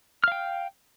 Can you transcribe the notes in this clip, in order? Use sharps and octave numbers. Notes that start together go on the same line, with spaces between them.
F5 G5 F6